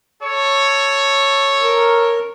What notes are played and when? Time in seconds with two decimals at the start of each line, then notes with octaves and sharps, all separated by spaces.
0.21 A4 C#5
1.62 A#4